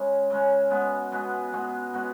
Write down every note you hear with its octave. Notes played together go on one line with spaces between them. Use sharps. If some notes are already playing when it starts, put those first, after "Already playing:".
Already playing: C#3 G#3 C#4
C#3 G#3 C#4
B2 G#3 B3 F#4
B2 G#3 B3 F#4
B2 G#3 B3 F#4
B2 G#3 B3 F#4